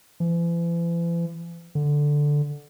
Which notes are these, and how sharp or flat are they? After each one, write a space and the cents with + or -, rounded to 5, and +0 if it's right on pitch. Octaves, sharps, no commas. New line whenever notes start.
E3 +45
D3 +0